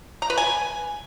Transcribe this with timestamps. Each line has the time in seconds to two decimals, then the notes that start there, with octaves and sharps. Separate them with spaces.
0.22 A#5
0.30 B4
0.38 G#5